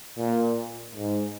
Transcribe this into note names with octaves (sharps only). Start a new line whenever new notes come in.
A#2
G#2